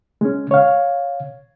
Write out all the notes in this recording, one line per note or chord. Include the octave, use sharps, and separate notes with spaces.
G#3 C#4
C#5 F5